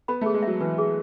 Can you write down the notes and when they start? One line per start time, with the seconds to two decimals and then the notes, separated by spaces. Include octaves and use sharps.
0.08 B3 B5
0.21 A3
0.26 G#4
0.34 G#3
0.42 F#3 E5
0.60 E3 B4
0.78 G#4